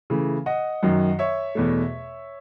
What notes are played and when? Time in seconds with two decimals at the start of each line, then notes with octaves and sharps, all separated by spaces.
0.10 C#3 E3 A3
0.46 D#5 F#5
0.83 F#2 D#3 F#3
1.19 C#5 E5
1.55 E2 B2 A3